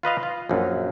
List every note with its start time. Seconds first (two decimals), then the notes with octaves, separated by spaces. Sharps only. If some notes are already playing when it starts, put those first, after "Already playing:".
0.03 F4 B4 D#5 F5
0.23 F4
0.49 A#1 F#2